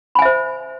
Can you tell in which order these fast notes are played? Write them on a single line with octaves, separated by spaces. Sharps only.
B5 G#5 E5 C5